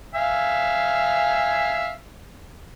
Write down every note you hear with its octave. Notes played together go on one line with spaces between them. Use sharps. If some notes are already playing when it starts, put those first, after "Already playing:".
E5 F5 G#5